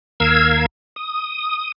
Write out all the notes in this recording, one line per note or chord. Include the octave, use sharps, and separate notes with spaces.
D#2 A#4 F5 E6 G#6
D#6